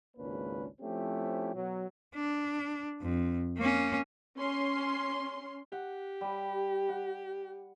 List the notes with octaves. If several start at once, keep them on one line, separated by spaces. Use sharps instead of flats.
G#1 C#2 A#3 C#4 D4 B4
F3 A3 C4 C#4 E4 G4
B2 F#3
D4
F2
A#3 C#4
C#4 C6
G4 F#5
G3 B5
F#5